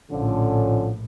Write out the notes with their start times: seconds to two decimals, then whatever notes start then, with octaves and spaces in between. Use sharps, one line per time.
0.11 A#1 A2 D3 F3 C#4